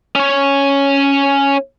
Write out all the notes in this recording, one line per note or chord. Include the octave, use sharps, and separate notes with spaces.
C#4 C#5